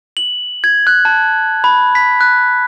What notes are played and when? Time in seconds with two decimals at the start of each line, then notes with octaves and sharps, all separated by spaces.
0.17 F#7
0.64 G#6
0.87 F#6
1.05 A5
1.64 B5
1.95 B6
2.21 F#6